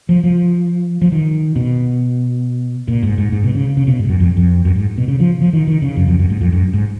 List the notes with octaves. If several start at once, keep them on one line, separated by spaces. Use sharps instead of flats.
F3
F3
F3
D#3
B2
A#2
G#2
G#2
G#2
B2
C#3
C#3
B2
G#2
F#2
F2
F2
F#2
G#2
B2
C#3
F3
F3
D#3
D#3
C#3
F#2
F2
F#2
G#2
F2
F#2
G#2